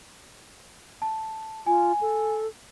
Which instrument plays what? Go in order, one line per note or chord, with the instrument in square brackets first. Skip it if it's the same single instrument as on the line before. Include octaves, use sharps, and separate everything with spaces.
[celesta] A5
[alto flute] F4 [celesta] G#5
[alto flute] A4